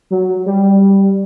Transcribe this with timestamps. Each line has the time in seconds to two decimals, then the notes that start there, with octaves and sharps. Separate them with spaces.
0.10 F#3
0.46 G3